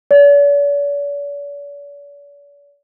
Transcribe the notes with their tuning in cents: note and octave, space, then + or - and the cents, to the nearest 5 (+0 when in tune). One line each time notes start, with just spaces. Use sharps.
D5 -45